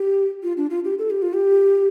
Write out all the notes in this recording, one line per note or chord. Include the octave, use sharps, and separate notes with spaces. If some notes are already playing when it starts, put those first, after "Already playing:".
Already playing: G4
F4
D4
F4
G4
A4
G4
F4
G4